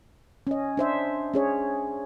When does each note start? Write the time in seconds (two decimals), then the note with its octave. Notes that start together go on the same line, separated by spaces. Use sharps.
0.47 C#4 D#5
0.77 D4 C5 E5
1.34 C#4 G#4 C#5